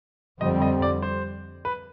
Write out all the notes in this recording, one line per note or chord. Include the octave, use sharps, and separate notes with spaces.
F2 D3 G3 C4 D#5
D#5
D5
C5
B4